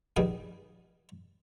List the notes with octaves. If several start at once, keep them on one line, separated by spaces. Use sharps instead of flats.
A#1 G2 D#3 G3 G#4